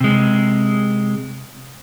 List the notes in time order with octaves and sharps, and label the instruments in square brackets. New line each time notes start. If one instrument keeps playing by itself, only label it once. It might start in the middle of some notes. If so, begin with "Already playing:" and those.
[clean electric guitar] C3 G#3